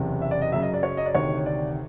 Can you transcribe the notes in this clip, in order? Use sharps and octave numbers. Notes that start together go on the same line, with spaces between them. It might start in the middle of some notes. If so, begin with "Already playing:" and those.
Already playing: F#1 E2 C3
E5
D5
D#5
F#2 C#3 F#3 E5
D#5
D5
C#5
D#5
D5
D2 C3 D#3 C#5
D5